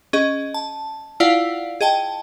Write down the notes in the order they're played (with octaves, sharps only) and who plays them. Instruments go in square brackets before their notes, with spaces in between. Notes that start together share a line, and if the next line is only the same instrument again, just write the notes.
[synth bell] C#4 G#4 D#5
A5
E4 F4 D5 F5 F#5
G#4 D#5 G5 A5